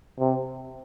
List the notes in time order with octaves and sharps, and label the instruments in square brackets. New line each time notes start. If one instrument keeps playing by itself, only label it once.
[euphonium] C3